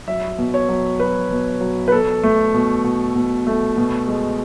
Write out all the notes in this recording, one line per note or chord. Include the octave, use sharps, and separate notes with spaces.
F#3 E5
B2
C#5
F#3
F#3 B4
B2
F#3
B4
B2 A4
A3
B2
B2
B2
A3
B2
G#3